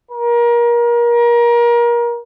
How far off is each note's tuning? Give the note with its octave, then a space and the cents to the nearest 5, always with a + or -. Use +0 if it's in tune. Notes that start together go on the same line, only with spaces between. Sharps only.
A#4 +30